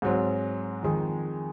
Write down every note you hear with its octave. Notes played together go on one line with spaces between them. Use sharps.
G#2 F#3 C4
F2 D#3 G#3